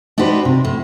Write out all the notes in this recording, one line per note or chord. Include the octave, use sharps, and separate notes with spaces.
D4 D#4 F#4 G4 B4 C5
C3
A2